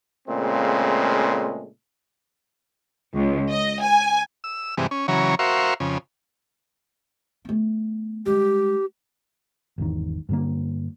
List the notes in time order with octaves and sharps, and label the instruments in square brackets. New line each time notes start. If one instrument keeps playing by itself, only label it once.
[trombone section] A#2 C#3 G#3 A3 C4
[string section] C#2
D#5
G#5
[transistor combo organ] E6
G2 C3 E3 G#3
C#4
C#3 E3 F#3 C#5 A#5
F#4 A#4 C5 E5 F5 C#6
F2 C#3
[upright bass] A3 B3
[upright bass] G3 G#3 [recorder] G4
[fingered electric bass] G#1 E2 D#3
G2 D3 A#3